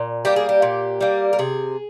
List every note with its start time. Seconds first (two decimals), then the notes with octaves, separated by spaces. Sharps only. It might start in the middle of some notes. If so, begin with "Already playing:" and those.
Already playing: A#2
0.25 G3 A#3 G4
0.36 G#4
0.49 G4
0.62 A#2
1.01 G3 A#3
1.33 A#4
1.39 C3 G#4